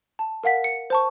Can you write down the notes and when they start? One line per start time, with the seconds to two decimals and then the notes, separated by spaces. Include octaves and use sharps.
0.19 A5
0.44 A#4 F5 F#5 B6
0.64 C#7
0.90 C5 A5 C#6